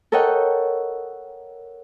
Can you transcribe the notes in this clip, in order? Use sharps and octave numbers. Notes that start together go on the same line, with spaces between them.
A4 A#4 C#5 D#5 F#5 G5